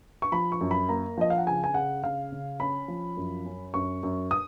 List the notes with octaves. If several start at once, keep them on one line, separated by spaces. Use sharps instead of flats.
C#6
F3 B5
C#6
F#2
B5
A#3 A#5
F3 D#5
F5
F#5
C#3 G#5
G#5
C#3 F#5
C#3 F5
C#3
C#4 B5
F3
F#2
C#4
F#2 C#6
F#2
D#6